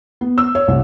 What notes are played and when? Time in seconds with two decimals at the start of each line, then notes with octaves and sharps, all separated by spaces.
0.21 B3
0.38 E6
0.55 C#5
0.68 C2